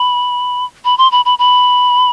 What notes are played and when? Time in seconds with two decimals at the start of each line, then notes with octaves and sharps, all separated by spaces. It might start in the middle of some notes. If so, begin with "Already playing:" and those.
Already playing: B5
0.85 B5
0.98 C6
1.12 B5
1.25 B5
1.39 B5